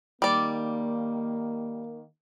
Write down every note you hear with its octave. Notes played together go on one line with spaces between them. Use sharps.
D#3 G3 A#3 D5